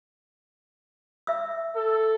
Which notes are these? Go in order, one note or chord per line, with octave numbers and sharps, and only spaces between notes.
E5 E6
A4